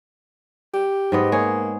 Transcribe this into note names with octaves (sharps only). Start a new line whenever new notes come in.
G4
G#2 B3 D#5
A#3 G#4 C#5